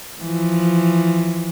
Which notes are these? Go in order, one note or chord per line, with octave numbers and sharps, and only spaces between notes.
E3 F3